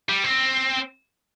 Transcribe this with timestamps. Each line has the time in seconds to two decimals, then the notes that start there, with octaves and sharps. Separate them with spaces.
0.09 G3
0.24 C4